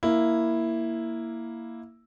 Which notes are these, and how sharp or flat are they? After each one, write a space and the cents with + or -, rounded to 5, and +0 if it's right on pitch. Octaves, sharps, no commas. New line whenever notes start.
A#3 +0 E4 +0